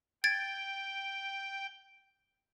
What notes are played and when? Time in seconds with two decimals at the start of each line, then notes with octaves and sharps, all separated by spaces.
0.24 G5 G#6 A6 D7